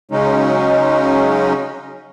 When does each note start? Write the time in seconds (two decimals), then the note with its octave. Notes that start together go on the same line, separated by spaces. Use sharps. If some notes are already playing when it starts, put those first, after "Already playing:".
0.11 C#3 F#3 G#3 C#4 D#4